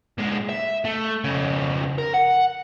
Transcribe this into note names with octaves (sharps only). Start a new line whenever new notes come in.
A#2 G#3
E5
A3
F2 C#3
A#4
F#5